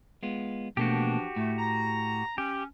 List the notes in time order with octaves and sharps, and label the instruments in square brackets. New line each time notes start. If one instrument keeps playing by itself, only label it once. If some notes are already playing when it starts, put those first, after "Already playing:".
[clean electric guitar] G#3 B3 F4
[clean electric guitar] B2 A3 A#3 [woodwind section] E3 F3 D4 [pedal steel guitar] F#4 G4
[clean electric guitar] A2 [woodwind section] A3
[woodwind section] A#5
[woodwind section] C#4 [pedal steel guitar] G4